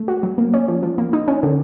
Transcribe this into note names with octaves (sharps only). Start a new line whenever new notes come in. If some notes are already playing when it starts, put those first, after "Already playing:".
Already playing: A3
F#4
F#3
A#3
C#4
F3
F3
A#3
D#4
C#4
D3